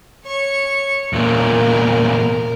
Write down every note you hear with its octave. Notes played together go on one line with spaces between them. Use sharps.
C#5 C#6
E2 A#2 A#4